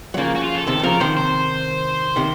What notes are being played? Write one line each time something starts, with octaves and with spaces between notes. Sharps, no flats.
F#3
C#3 F3 A#3
F#4
F4
A4
C3 D#3 A4
D#3
C#3 F3 A#4
C3 D#3 C5
C5
C3 D#3